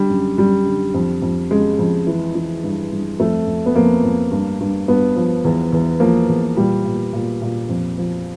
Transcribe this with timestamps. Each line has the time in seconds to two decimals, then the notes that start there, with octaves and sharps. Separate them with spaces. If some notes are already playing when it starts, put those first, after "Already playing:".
Already playing: D3 G3
0.10 F#2
0.38 F#2 G3
0.66 D3
0.94 F2
1.22 F2
1.51 C#3 G#3
1.79 F2
2.07 E3
2.35 E3
2.63 G2
2.92 G2
3.19 F2 A3
3.47 F2
3.66 B3
3.76 F2 A#3
4.04 F2
4.31 G2
4.60 G2
4.88 G2 B3
5.16 F3
5.44 E2
5.72 E2
6.00 F3 A#3
6.29 E2
6.57 A#2 G3
6.85 A#2
7.13 A#2
7.42 A#2
7.69 F2
7.98 F3